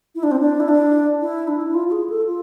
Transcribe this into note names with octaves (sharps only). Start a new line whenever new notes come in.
E4
D4
C4
D4
E4
D4
E4
D4
E4
F4
F4
G#4
A4
F4